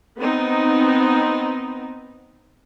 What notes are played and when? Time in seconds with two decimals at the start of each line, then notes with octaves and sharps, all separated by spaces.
0.18 B3 C4 D#4